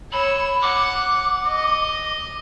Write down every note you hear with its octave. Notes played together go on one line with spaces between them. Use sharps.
C#5 B5 E6
F#5 D6
D#5